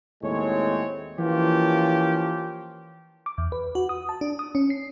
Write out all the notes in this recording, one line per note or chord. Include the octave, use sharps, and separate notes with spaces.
D#2 A2 G#3 C4 C#5
E3 F3 A#3 C#4 F4 G4
D6
E2
B4
F#4
D#6
A5
D4
D#6
C#4
C7